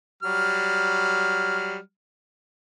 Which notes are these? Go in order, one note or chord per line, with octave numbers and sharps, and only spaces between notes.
F#3 G3 F6